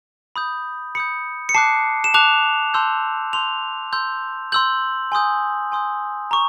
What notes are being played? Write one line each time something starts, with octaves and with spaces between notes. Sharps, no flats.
B5 D#6 G6
B5 D#6 G6 C#7
C#7
A5 D6 F#6 C7
E7
A5 D6 F#6 F7
A5 C6 E6 G6
A5 C6 E6 G6 F7
C6 E6 G6
C6 E6 G6 F#7
G#5 C6 D#6 G6
G#5 C6 D#6 G6
A#5 C#6